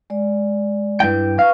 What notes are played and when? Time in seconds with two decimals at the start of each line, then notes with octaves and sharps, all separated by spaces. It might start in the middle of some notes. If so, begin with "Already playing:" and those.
0.10 G#3 D5
1.00 G2 E4 B4 G5
1.39 B4 F5 C#6